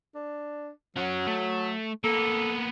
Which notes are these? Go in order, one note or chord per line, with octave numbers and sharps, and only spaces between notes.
D4
F#3 C#4 F#5
A3
A#3 B3 A4